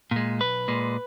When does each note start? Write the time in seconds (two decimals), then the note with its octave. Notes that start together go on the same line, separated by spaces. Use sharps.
0.11 A#2 G#3
0.40 B1 B4
0.68 A#2 G#3